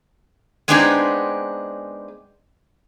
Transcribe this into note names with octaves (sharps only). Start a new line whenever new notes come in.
G#3 B3 C4 D4 D#4 G#4